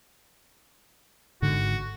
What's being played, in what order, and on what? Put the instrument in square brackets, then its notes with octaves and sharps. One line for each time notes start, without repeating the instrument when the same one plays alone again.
[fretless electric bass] G#1 G#2 D3 [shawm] F#4